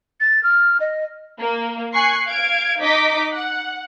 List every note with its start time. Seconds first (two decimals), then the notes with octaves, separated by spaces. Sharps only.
0.20 A6
0.43 F6
0.80 D#5
1.39 A#3
1.94 G#5 C#6 F#6 C7
2.26 F5 G#6 D7
2.80 D#4 D#5 D6 B6
3.33 F#5